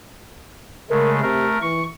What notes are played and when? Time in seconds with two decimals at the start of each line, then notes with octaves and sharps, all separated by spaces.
0.90 C#3 G#3 A3 A#4
1.22 C3 A3 A#4
1.62 E3 C#6